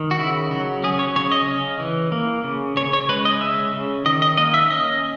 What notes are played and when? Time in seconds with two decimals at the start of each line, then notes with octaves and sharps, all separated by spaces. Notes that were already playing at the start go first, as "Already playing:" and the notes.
Already playing: D#3
0.11 F#4
0.19 C#3 E4
0.51 F#3 F#4
0.84 C#4 G#4
0.99 C#5
1.16 C#3 C#5
1.32 D#5
1.48 C#4
1.80 E3
2.12 A#3
2.44 C#3
2.77 C#3 C#5
2.93 C#5
3.09 G#3 B4
3.25 D#5
3.41 C#4 E5
3.73 C#3
4.05 D#3 D#5
4.22 D#5
4.37 A#3 D#5
4.54 E5
4.70 C#4 D#5